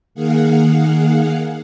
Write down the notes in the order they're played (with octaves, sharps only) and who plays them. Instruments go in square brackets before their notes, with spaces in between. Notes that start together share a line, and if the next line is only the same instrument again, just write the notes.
[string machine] D#3 A#3 G#4 F5 F#5